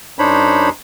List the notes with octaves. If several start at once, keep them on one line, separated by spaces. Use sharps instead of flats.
F#2 D4 D#4 C5 C#5 B5